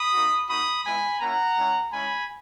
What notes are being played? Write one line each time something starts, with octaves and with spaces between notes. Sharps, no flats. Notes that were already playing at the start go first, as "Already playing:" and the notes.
Already playing: B5 D#6
A#3 D#4 F#4
A#3 D#4 F#4 B5 D#6
G#3 B3 E4 G#5 B5
A#3 C#4 E4 F#5 A#5
G#3 C#4 E4
G#3 C#4 E4 G#5 B5